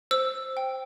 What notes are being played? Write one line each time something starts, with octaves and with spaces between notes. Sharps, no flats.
C5 E6
G5